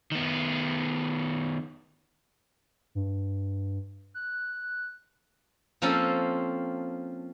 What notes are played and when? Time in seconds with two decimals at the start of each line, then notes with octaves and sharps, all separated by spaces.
0.12 D#3 B3
2.95 G2
4.14 F#6
5.82 F3 A#3 C4 C#4 A4